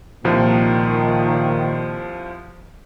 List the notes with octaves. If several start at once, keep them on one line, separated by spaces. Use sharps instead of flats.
C2 A#2 D#3 F3